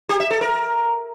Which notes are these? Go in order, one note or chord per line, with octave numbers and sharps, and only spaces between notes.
G4
E5
A4
A#4